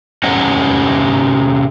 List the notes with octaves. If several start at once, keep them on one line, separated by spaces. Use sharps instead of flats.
C3 C#4 C#5 D#5 F#5